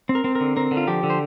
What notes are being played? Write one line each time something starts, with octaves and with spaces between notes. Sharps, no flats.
C4
A#4
C4
D3 A#4
C4 A#4
D3
F4
F3 G4
D3
C5